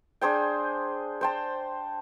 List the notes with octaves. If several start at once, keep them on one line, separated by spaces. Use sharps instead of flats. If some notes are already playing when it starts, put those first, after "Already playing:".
D4 G#4 C5 G5
C5 G5 A5